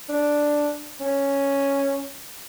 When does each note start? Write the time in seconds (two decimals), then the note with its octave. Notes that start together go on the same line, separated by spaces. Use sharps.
0.09 D4
1.00 C#4